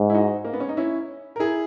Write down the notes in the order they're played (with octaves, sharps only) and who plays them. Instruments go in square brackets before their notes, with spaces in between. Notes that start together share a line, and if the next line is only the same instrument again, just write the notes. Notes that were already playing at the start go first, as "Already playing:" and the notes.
Already playing: [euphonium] G#2
[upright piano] E4
D#4 F#4
A#3
B3
C#4
D#4
C#4 E4
A#4
E4 G#4